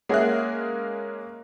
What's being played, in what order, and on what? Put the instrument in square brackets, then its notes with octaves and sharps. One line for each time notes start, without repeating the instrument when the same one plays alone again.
[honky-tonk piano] G#3 C#4 G#4 [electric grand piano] A#3 A#4 F#6 [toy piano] E5 F#5